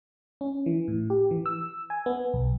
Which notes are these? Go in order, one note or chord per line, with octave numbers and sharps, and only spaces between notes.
C#4
E3
A2
G4
E3
E6
G#5
B3
B1